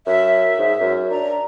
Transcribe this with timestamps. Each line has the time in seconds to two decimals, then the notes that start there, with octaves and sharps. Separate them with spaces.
0.06 F#2 E5
0.58 G#2
0.80 F#2
1.11 D4 A#5